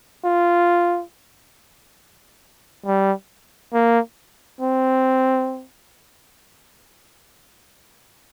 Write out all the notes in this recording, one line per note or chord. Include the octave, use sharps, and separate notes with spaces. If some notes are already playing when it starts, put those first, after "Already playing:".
F4
G3
A#3
C4